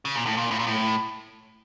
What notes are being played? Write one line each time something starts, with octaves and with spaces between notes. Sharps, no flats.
C#3
A#2
A2
A#2
A2
A#2
A2